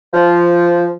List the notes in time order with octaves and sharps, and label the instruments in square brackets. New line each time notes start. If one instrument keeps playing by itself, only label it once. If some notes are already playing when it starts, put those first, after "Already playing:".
[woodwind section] F3